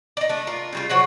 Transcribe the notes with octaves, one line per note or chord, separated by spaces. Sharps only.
D#4 D5
A3 D4
F4 A#4
C#3 G3 F4
C#3 F#3 C5 F#5